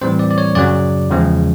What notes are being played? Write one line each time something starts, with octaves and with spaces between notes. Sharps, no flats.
A2 E3 G3 C4 C5
D5
D5
C#5
F#2 C#3 F#3 D5
E2 C#3 F3 G#3